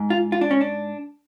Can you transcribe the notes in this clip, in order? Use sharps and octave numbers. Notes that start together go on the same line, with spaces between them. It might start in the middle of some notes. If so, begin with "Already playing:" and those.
Already playing: G#2
F4
F4
D4
C#4
D4